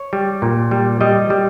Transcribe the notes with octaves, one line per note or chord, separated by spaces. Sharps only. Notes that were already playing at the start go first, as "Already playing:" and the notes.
Already playing: C#5
G3
A#2
G3
G3 D#5
G3